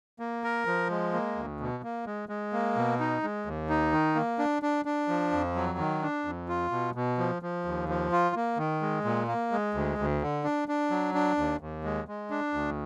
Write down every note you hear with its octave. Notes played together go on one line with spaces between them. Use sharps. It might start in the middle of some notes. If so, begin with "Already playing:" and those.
A#3
A#4
F3
G#3
A#3
D2
B2
A#3
G#3
G#3
A#3
B2
D#4
G#3
D#2
D#4
D#3
A#3
D4
D4
D4
F3
F2
F#3
D#3
D4
F2
F4
B2
B2
F3
F3
D#2
F3
F4
A#3
D#3
G#3
A#2
A#3
G#3
D2
D2
D3
D4
D4
F#3
D4
D#2
D#2
G#3
G#3
D4
D2